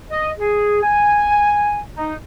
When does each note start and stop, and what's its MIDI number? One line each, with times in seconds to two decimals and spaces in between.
0.11 0.31 75
0.38 0.81 68
0.83 1.79 80
1.96 2.14 63